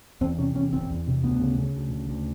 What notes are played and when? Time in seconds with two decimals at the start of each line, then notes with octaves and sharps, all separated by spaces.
0.21 E2 C4
0.38 C3 C#4
0.55 E2 C#4
0.73 F#1 C4
0.90 E2
1.07 C3
1.23 D2 B3
1.41 C#3
1.58 C#3
1.75 D2
1.92 C#3
2.09 D2